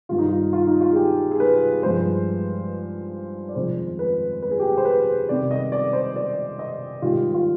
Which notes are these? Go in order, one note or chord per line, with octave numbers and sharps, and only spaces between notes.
G2 D#3 G3 F4
D#4
F4
F4
D#4
F4
G#4
G4
G#4
B4
G2 F3 G#3 C5
D5
F2 D#3 G#3 C5
B4
B4
G#4
G4
G#4
C5
B4
C3 D#3 G3 D5
D#5
D5
C5
D5
D#5
G#2 D#3 G3 F4
F4